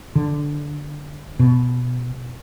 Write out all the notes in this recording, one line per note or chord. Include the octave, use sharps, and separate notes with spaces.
D3
B2